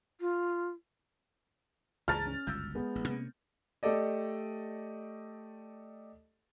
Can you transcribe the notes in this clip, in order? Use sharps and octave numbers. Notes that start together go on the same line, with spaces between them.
F4
C#2 G2 E3 G#4 A5 A#5 F6 A6
C#4
G1 C#2 F#2 E6 G6
G#3 B3
A1
C3 A#3 C#4
A3 G4 A4 D5 D#5